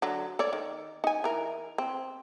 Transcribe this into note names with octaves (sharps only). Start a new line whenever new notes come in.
D3 F#3
A4 C#5 D5
D#3
D#4 G#5
E3 A#4
C4